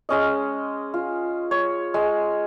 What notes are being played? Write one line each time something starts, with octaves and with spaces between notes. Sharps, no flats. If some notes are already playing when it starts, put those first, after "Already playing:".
G#3 C#4 D#5
F4
C#5
G#3